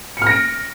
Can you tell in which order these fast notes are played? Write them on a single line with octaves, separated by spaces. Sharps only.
C#7 F6 A#6 D7